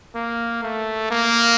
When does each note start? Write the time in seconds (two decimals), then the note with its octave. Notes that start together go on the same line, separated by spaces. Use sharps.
0.15 A#3
0.63 A3
1.10 A#3